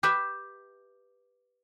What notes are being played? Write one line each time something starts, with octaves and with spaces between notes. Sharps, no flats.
G4 B4 E5 G5